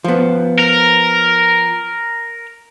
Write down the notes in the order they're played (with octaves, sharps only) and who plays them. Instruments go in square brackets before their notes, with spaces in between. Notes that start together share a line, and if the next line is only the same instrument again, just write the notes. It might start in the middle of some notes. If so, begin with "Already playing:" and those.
[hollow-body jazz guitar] F3 B3
[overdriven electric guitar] A#4